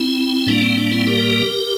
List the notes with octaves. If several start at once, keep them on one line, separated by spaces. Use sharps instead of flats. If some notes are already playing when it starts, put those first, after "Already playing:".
Already playing: C4 E4
A2 G3 A#3 D4
C4
D4
C4 E4
G4 A#4